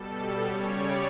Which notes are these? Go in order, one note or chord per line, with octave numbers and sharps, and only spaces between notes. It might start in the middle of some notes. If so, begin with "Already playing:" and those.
Already playing: B2 G3 A4
A4
C#3 G3 C#5
D5